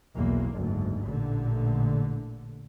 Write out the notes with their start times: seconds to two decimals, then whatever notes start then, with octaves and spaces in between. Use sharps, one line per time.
0.16 B1 E2 A#2 A#3
0.55 F#1 D2 G#2
1.05 A1 A#2 D3